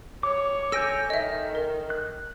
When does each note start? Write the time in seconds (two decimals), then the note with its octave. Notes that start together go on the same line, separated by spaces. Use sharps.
0.23 C#5 D6
0.72 A4 G#5 E6 G6 A#6 D7
1.10 D#3 D#5 E5
1.55 A#4
1.90 F#6